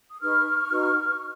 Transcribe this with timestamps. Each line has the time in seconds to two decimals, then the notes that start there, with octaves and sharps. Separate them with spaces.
0.11 D#6
0.21 D#4 G#4 B4 C#6 F6
0.71 D#4 F#4 B4